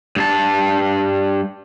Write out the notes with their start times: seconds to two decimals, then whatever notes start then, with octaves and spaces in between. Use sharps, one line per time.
0.16 G2 A5